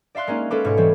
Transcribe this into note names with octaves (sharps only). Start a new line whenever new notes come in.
D5 E5 F5 C6 F#6
G#3 A#3 C#4 D#4
G#3 C#4 A4 B4 D6
G#2 B2 C#5 D6
E3 G3 A3 C4